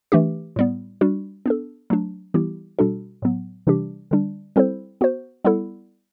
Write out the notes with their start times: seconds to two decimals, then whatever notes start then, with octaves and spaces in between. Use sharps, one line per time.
0.12 E3 A3 D4 G4
0.56 A2 G3 B3
1.01 G3 D4 F#4
1.46 B3 D4 A4
1.90 F#3 A3 D4
2.34 E3 G3 B3 E4 G4
2.79 B2 G3 D4 F#4 A4
3.22 A2 F#3 B3
3.67 C3 E3 G3 D4 G4
4.11 D3 G3 D4
4.56 G3 C4 E4 A4 C5
5.01 B3 F#4 C5
5.45 G3 B3 E4 A4